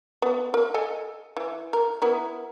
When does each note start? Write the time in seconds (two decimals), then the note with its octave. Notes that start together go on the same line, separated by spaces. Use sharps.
0.22 B3
0.54 A#4
0.74 A4 D#5 G#5
1.37 E3
1.73 A#4
2.02 B3 E4 A#4